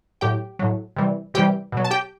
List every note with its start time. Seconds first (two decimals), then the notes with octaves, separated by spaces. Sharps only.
0.21 A2 F#3 G4 G5
0.59 A2 F#3
0.96 C3 E3 G3
1.34 C3 E3 G3 G4 G5
1.72 B2 F#3
1.85 A5
1.91 G4 G5